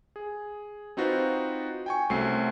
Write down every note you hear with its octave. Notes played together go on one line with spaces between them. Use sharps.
G#4
C4 D#4 F4 F#4 B4 C5
G5 G#5 C#6
C2 A3 C4 C#4 F#4 C7